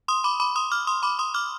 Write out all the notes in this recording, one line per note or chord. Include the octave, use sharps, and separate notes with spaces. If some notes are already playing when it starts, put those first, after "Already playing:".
C6 D#6
B5 D6
B5 D6
C6 D#6
D6 F6
C6 D#6
B5 D6
C6 D#6
D6 F6